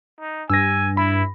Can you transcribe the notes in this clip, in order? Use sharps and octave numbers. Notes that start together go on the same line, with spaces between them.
D#4
G2 G#5 E6 A#6
E4 B5